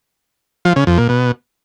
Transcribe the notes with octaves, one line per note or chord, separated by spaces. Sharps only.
F3
C#3
F2
A#2
B2